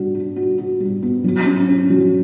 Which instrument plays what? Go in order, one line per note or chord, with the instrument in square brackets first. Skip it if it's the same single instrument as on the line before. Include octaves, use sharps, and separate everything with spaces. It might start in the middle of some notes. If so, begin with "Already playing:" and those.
Already playing: [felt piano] G3 D4 F#4
D4
F#4
F#4
G3
B3
F#3
C#4
C#4
F#3